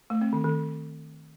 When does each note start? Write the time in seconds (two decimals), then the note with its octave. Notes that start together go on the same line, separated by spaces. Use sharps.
0.10 A3
0.21 C4
0.33 D#3
0.44 D#3